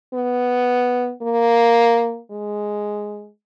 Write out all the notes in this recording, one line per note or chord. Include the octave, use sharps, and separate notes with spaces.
B3
A#3
G#3